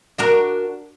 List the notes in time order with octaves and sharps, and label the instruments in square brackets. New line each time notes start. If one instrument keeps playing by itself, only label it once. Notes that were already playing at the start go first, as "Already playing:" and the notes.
[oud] D4 F#4 A#4